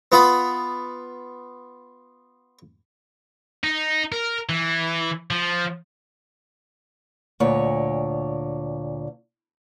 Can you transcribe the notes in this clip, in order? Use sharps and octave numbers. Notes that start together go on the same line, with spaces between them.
B3 F4 B5 D#6
D#4
A#4
E3
F3
D2 A#2 C#5